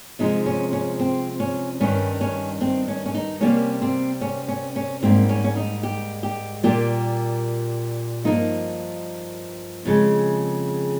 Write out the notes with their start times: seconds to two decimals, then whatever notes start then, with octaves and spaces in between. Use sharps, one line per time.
0.19 C3 F3 G#3 D#4
0.46 C#4
0.73 C#4
1.00 C4
1.40 C#4
1.80 G2 D#3 G3 C#4
2.21 C#4
2.61 C4
2.88 C#4
3.06 C#4
3.14 D#4
3.41 C3 G3 A#3 C#4
3.82 C4
4.21 C#4
4.48 C#4
4.76 C#4
5.02 G#2 G3 A#3 C4
5.29 C#4
5.44 C#4
5.56 D#4
5.83 G4
6.23 G4
6.63 A#2 G3 A#3 G4
8.24 G2 F3 A#3 D#4
9.85 F2 C#3 G#3